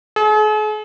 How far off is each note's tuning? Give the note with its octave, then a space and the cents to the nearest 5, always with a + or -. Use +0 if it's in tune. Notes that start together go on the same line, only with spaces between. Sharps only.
G#4 +45